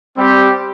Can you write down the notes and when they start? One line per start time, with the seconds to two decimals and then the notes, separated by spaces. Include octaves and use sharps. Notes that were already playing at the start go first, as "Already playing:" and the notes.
0.16 G3 C4 G4